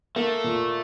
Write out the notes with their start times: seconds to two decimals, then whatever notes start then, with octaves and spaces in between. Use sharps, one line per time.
0.16 A3 A#3
0.44 A#2